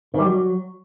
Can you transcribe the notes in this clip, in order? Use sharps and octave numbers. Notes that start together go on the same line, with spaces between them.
D#3
G3
F#3